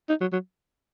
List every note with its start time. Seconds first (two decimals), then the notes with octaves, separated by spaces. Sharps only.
0.09 D#4
0.21 F#3
0.33 F#3